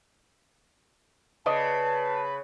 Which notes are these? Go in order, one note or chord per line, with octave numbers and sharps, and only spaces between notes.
C#3 B4 D5 D#5 A5